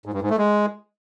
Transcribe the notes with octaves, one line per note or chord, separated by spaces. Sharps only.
G#2
G2
G#2
A3
G#3